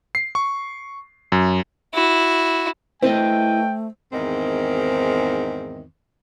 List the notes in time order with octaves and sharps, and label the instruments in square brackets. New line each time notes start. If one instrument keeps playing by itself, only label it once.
[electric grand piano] C7
C#6
F#2
[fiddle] E4 F#4
[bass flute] A3 [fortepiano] C4 [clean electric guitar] E4 B4 D#5 [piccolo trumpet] G5
[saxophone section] E2 G#2 D#3 C4